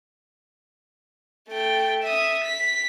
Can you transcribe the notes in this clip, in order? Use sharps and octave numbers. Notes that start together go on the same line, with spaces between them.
A3 G5
E5 D#6
B6